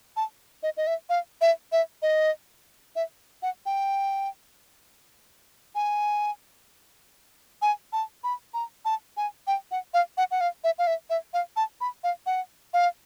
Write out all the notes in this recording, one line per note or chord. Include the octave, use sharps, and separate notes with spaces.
A5
D#5
D#5
E5
F5
E5
E5
D#5
E5
F#5
G5
G#5
G#5
A5
B5
A#5
A5
G#5
G5
F#5
F5
F#5
F#5
F5
E5
F5
E5
E5
F5
A5
B5
F5
F#5
F5